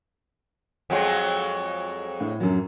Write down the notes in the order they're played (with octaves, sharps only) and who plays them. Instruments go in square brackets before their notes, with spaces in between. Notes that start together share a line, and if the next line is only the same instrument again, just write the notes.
[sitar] F2 F#3 G#3
[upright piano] A2
F#2 F#3